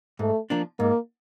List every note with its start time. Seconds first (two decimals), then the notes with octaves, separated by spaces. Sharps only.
0.19 G#2 A3
0.50 F3 A#3 D4
0.79 G#2 A#3